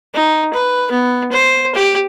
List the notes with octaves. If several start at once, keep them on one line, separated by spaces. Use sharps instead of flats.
D#4
B4
B3
C5
G4